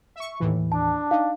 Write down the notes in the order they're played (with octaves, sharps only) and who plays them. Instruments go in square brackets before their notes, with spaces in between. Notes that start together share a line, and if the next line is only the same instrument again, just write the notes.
[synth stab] E5 C#6
D#2 A2 E3
[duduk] D4 [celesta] A5
[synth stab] D#4 [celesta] F5